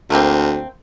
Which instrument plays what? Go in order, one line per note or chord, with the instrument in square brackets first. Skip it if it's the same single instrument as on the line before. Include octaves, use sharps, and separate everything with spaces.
[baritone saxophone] D2 [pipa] A3 A#3 C4